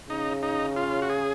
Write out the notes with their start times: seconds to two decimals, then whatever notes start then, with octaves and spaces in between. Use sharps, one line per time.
0.09 C#3 D#4
0.43 D#4
0.76 F4
1.02 F#4
1.10 G#4